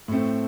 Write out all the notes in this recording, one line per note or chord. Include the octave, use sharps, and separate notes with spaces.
A2 A3 C4